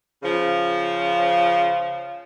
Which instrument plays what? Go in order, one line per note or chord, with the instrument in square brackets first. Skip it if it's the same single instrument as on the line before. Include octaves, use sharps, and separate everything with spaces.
[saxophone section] C#3 F3